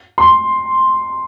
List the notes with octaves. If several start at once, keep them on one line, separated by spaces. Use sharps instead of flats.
C6